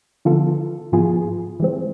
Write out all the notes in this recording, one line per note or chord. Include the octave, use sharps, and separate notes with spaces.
D3 F3 B3 F4 A4
G#2 F3 B3 F4 G#4
E3 G#3 C4